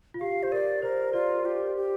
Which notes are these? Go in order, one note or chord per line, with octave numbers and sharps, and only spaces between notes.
F4
G4 F5
G4 C5
A#4 D5
A#4 C5
F4 D5
G4
G4